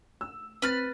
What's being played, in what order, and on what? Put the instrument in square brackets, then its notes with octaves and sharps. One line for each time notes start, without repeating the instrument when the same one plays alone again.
[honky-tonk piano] E6
[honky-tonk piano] C4 A6 [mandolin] B4 F6